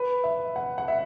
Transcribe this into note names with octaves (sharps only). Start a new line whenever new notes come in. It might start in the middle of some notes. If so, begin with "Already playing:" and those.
Already playing: B4
E5
F#5
F#5
E5